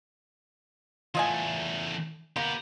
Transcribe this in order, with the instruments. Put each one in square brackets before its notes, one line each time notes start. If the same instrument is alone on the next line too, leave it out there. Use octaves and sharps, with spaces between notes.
[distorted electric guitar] E2 A3 [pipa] F4 D#5 G#5
[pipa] A#3 [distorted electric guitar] B3 G4